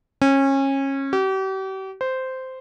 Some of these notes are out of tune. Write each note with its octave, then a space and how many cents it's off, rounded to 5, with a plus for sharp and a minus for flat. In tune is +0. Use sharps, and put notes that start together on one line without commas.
C#4 -25
G4 -40
C5 -10